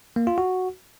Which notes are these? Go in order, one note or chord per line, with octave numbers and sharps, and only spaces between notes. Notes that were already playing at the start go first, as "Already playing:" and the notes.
A#3
F4
F#4